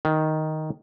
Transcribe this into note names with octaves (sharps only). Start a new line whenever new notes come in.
D#3